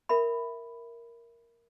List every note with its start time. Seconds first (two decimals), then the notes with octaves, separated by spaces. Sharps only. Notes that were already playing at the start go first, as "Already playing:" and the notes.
0.09 A#4 E5 B5